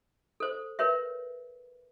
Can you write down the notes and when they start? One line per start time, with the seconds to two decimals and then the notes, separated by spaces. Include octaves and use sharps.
0.40 A4 C5
0.79 A#4 B4 C#5 E5